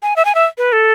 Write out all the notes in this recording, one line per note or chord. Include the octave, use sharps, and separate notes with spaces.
G#5
E5
G#5
E5
B4
A4